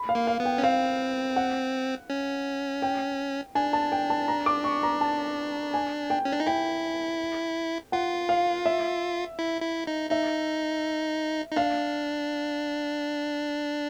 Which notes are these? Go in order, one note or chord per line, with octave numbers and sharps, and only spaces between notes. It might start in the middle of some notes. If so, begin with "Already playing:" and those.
Already playing: B5
F5
A#3
F5
B3
G5
C#4
C4 F5
F#5
C#4
G5
D4 G#5
A5
G5
A5
A#5
D6
C#6
A#5
A5
G#5
G5
C#4
D4
D#4
E4 G5
F4 F#5
F5
E5
E4
E4
D#4
D#4 E5
D#4
D4 F5